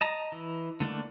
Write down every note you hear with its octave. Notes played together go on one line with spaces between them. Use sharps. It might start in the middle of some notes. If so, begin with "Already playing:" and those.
D#5 A5 A#5
E3
D3 A3 A#3 D4